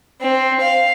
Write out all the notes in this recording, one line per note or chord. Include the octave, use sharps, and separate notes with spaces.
C4
F5